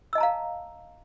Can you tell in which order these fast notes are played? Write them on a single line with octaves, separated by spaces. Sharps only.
E6 D#5 A5 A#5 F5